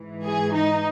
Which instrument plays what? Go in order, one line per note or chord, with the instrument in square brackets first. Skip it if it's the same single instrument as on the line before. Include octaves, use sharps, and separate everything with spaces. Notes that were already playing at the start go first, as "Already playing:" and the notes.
Already playing: [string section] G#2 E3
G#4
D#4